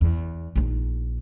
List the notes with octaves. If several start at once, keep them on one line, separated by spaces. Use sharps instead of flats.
E2
A#1 D#4